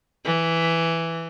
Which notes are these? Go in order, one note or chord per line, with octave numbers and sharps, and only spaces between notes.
E3